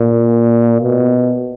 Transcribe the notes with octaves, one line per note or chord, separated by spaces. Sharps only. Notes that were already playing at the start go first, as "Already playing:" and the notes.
Already playing: A#2
B2